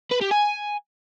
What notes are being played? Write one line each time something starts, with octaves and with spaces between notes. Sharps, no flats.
B4
G4
G#5